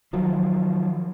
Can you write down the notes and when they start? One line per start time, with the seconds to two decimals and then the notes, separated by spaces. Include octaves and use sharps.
0.13 D#3 F3 F#3